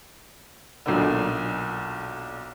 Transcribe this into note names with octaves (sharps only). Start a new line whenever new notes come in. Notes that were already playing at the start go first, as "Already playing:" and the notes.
B1 A#2 D3